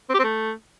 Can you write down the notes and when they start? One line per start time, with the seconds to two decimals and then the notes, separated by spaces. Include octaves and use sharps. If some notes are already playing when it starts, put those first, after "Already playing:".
0.09 C4
0.14 G4
0.19 C4
0.24 A3